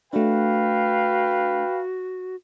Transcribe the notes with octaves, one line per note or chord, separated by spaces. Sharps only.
A3 D4 F#4 B4 F5 G5